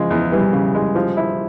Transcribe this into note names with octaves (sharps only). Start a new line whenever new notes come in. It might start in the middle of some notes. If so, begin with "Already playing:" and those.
Already playing: C#3 F3 G#3
E2
E3 G3
C#3
G#3
F3
E4